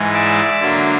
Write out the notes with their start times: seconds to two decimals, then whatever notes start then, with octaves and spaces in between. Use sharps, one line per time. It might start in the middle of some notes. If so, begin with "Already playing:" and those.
Already playing: G#2 E3 G#3
0.13 D5 E5
0.60 D3 F#3 A#3 D4